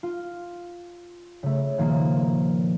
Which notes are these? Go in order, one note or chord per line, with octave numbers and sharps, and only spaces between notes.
F4
C#3 A3
A#2 D#3 F3 A#3